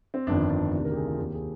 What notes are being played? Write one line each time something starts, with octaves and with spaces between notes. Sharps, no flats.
C4
G1 F2 D#3 D4
D4
D2 C3 D#3 D4
A#4
G4
G#4
F4
D#2 D#3 G4
G#4